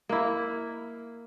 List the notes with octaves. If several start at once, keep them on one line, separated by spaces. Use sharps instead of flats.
A#3 E4